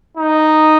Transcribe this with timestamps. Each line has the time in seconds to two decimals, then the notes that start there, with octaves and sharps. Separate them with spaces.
0.17 D#4